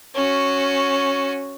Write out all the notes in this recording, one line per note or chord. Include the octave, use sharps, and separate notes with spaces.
C#4 F#4